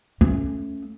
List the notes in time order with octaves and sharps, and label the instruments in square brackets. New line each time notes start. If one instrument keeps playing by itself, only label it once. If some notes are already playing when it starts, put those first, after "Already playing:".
[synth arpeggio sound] D2 [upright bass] A3 C#4